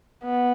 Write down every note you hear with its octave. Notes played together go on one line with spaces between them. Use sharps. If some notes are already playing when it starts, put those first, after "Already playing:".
B3